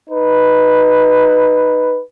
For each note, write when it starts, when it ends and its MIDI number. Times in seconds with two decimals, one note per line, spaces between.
0.10 2.01 63
0.10 2.01 71